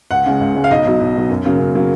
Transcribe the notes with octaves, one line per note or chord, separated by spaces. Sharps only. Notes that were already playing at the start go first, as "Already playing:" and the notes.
C#2 F#5
C#3 G#3
C#2
C#3 G#3
F5
B1 D#5
B2 F#3
B1
B2 F#3
F#2
C#3 F#3 A#3
F#2
C#3 F#3 A#3